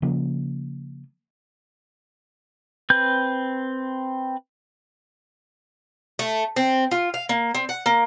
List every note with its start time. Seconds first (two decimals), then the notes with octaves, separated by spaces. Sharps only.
0.02 C#3 F3 A#3
2.90 C4 B4 G6
6.19 A3
6.56 C4
6.91 F4
7.14 F5
7.29 A#3
7.55 C4
7.69 F#5
7.86 A#3